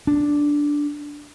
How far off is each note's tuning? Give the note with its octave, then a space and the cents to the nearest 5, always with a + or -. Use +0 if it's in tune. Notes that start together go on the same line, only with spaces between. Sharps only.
D4 -5